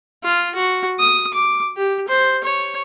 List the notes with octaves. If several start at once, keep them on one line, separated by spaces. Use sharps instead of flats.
F4
F#4
D#6
D6
G4
C5
C#5